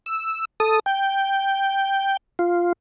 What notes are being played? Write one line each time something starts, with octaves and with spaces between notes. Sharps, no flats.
E6
A4 D#6
G5
F4